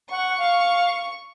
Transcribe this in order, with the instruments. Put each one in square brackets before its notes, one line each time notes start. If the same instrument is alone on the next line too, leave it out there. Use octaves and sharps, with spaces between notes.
[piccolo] F#5 [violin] C#6
[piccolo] F5